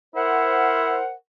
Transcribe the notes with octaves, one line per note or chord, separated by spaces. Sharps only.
E4 A#4 C5 F#5